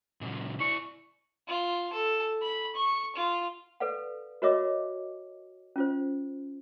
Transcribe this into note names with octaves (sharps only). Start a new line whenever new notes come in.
A#2 C#3 F#3
E4 D5 C#6
F4
A4
B5
C#6
F4
A4 B4 D5 F5 F#5
F#4 A#4 C#5 D#5 E5 D6
C#4 F4 C5